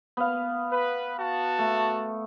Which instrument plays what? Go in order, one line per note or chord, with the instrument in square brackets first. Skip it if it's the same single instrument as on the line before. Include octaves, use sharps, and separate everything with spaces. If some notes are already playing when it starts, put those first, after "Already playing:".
[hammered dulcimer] B3 F5
[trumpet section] B4
F#4 A5
[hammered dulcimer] A3